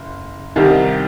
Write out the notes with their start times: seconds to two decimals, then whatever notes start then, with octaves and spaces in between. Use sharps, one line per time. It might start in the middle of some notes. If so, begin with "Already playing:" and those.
Already playing: F#1
0.56 C2 C3 D#3 G3